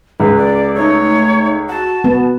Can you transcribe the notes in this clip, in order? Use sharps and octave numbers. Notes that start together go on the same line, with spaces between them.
C#2 C#4 B4
D5
A3 D#4 C#5
F#4 A5
B3